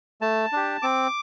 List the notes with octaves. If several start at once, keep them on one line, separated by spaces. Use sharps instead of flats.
A3 A5
D4 G4
C4 D6